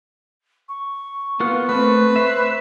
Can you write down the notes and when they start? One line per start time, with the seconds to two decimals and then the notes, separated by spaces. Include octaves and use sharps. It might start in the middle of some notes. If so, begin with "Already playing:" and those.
0.68 C#6
1.40 A#3 B3 F4 F#5 C#6
1.69 A3 C4 B4
2.16 C5 E5